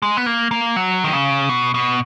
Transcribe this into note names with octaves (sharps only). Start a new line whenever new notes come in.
G#3
B3
A#3
A#3
F#3
D#3
C#3
B2
B2